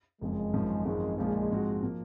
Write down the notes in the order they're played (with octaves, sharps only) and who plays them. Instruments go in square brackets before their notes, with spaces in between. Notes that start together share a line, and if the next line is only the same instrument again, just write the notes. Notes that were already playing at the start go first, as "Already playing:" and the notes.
[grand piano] F#1 F2 C#3 F3 [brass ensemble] G#3
[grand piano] G#1 F#2 F3
[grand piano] G#1 F#2 F3 C4 [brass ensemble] G#3
[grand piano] A#1 A#2 F3 A#3 F4 [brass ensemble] G#3
[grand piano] G#2 F3 C4 F#4
F3 A#3